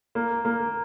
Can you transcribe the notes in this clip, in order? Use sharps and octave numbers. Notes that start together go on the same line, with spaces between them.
A#3
A#3